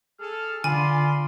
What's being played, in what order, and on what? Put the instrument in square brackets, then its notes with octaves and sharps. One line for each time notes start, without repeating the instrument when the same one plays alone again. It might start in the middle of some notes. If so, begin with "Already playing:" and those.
[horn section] G#4 A4 [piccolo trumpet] F6
[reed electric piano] D3 [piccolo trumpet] F4 [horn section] D5 B5 C6 [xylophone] G#5